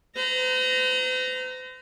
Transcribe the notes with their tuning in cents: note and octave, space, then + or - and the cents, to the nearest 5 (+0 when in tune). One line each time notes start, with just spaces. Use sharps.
C5 -45 A#5 +0